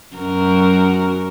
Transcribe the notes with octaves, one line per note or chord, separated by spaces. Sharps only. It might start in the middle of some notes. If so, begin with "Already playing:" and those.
F#2 F#4 A#4